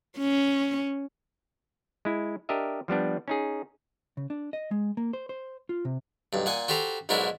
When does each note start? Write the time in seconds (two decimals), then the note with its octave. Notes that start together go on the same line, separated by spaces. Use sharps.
0.18 C#4
2.05 G#3 E4
2.49 D4 G4 A#4 D#5 E5
2.88 F3 G3 B3 D4
3.28 C#4 D#4 G#4
4.17 C#3
4.30 D4
4.53 D#5
4.71 G#3
4.97 A#3
5.13 C5
5.29 C5
5.69 F4
5.85 C3
6.33 B1 G2
6.46 A#2 F#5 G#5 D#6
6.68 F#4 G4 A4 C5 A#5
7.09 B1 G#2 D4 E4 F#4 A#4